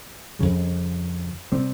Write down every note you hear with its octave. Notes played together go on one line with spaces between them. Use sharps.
F2 C#3 G3
C3 G3 C4